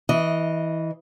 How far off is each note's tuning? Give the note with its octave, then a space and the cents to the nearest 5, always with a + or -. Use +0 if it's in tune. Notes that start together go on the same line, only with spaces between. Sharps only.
E3 -15 D#5 +0